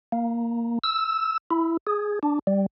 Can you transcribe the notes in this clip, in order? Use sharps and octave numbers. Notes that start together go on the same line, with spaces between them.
A#3
E6
E4
G#4
D4
G3